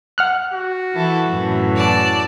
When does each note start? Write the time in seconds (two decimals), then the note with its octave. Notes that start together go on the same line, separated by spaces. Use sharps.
0.18 F#5 F6 F#6
0.54 F#4
0.93 E3 E4 A4
1.30 F#2 A2 E3
1.76 D5 A5